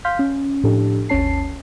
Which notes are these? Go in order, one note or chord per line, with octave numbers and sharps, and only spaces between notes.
F5 C6 F6 G6 B6
C#4
A2 F3 D4 G4 A4
G#1 D#2 C#4 C#5 A5 C7